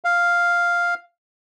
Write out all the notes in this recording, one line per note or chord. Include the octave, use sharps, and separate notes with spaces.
F5